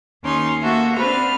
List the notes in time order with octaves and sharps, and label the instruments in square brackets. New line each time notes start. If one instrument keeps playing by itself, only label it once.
[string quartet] D#2 C#4 D#4 C6
A#3 F#4 A4 E5
C4 D4 B4 C5 F6